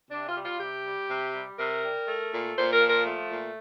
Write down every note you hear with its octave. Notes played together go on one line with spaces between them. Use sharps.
C3 D4
F4
G3
F4
C3 G4
G3
C3
G3
C3 A#4
G3
A3
A#2
A#2 C5
A#4
F3
A#4
A3
A#2